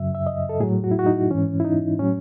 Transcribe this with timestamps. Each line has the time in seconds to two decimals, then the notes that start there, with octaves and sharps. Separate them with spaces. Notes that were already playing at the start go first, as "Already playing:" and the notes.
Already playing: F#2 C#3 F#3 E5
0.15 E5
0.27 D#5
0.49 A4
0.60 A2 G#4
0.63 F#3
0.84 F#4
0.91 E4
0.99 F#4
1.06 D#4
1.31 G#2 E3 C#4
1.60 E4
1.65 D#4
1.99 A2 F#3 C#4